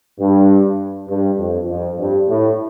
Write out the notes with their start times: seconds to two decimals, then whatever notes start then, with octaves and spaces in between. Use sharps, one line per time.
0.19 G2
1.09 G2
1.39 F2
1.69 F2
1.99 G2
2.29 A2